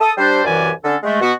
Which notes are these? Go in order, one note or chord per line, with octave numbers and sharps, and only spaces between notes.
A4 D#6
G3 D4 C5
C2 F#2 E3 G4 D5 G#5
D3 C#4 A4
G#3 A3
B2 B3 F#4